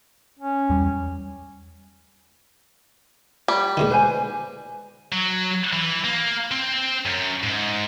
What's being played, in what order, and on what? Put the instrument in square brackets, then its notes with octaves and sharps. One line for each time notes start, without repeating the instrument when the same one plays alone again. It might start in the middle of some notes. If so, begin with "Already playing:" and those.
[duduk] C#4
[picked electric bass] E2 G3
[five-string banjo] G3
[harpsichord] G#2 B2 D#3
[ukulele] B4 C5 G#5
[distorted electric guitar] F#3
E3
A#3
C4
F#2
G#2